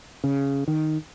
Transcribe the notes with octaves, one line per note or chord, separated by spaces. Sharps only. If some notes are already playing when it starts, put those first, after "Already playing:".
C#3
D#3